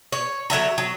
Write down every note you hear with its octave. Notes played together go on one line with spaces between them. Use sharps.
C#5
D3 F#3 E5 A#5
F#3